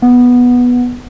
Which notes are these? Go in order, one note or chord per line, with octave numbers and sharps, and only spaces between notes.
B3